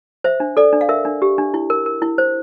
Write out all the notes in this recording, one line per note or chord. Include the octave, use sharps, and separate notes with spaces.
C5 E5
D4
A4 D5
D4
F5
A#4 E5
D4
G4
D4
E4
A#4
A#4
E4
C5